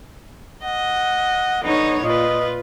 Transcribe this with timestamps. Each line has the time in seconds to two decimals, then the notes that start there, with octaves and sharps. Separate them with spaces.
0.63 D#5 F#5
1.64 D3 B3 D#4 C#5
2.04 A#2 F4 B4 D#5